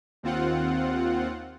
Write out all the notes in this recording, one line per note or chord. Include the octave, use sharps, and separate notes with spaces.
D#2 C4 F4 F#5